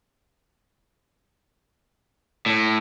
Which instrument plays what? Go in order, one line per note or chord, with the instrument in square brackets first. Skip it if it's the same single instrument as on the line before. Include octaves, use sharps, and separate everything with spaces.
[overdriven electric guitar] A2